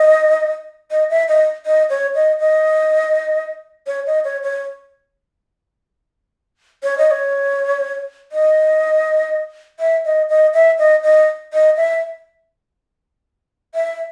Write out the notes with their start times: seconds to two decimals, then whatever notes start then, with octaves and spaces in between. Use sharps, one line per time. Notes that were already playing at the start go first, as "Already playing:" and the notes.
Already playing: D#5
0.91 D#5
1.10 E5
1.28 D#5
1.66 D#5
1.90 C#5
2.15 D#5
2.40 D#5
3.87 C#5
4.07 D#5
4.24 C#5
4.43 C#5
6.83 C#5
6.98 D#5
7.11 C#5
8.32 D#5
9.80 E5
10.05 D#5
10.29 D#5
10.54 E5
10.79 D#5
11.03 D#5
11.53 D#5
11.77 E5
13.75 E5